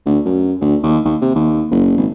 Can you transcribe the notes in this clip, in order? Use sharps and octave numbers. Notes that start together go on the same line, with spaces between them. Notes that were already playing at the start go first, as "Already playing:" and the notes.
D2
F#2
D2
D#2
D#2
C3
D#2
F#1
G#1